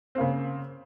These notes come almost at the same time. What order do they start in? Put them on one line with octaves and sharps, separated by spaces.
C4 A#3 C#3